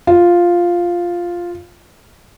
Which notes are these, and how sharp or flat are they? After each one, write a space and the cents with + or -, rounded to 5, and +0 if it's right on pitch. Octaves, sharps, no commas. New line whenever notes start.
F4 +0